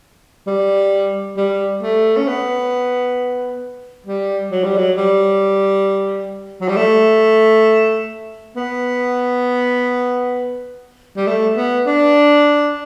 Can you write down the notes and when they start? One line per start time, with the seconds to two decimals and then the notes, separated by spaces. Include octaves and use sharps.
0.47 G3
1.37 G3
1.82 A3
2.17 C#4
2.27 B3
4.06 G3
4.51 F#3
4.64 G3
4.78 F#3
4.97 G3
6.61 F#3
6.68 G3
6.76 A3
8.56 B3
11.17 G3
11.27 A3
11.57 B3
11.86 D4